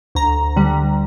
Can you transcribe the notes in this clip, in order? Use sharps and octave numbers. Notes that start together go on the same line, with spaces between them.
D2 A#5
D3 G3